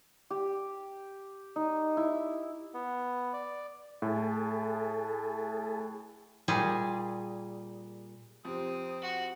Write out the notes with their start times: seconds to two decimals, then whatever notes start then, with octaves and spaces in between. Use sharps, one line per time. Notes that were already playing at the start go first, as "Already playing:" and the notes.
0.30 G4
1.56 D#4
1.97 E4
2.74 B3
3.33 D5
4.02 A2 G#4 A4
6.48 A#2 G3 G#4
8.45 F2 C3 C4 D#6
9.02 F#4